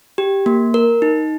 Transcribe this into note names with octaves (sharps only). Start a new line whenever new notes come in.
G4
A#3
A#4
D#4